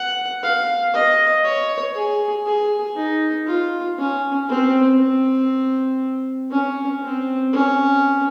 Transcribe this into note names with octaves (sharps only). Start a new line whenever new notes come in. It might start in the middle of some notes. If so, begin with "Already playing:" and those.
Already playing: F#5
F5
D#5
C#5
G#4
G#4
D#4
F4
C#4
C4
C4
C#4
C4
C#4